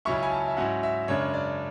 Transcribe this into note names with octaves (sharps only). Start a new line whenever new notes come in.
C#2 C#3 F#3 C#4 E4 C#6
G#5
A5
E5
G#2 F#3 C#4 E4 F#5
E5
F#2 C#3 G#3 D4 C#5
D5